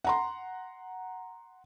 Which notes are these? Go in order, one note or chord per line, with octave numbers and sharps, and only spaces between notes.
F#5 A#5 C6